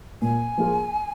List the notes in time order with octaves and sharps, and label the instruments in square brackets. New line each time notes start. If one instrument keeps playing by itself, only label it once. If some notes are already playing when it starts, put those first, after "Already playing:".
[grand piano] A#2 [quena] G#5
[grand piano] F3 A#3 F4 G#4